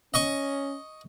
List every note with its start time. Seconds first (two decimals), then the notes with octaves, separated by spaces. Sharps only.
0.14 C#4 D#5 C#6 D#6